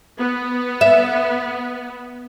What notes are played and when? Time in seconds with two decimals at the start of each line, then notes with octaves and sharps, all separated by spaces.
0.19 B3
0.81 E5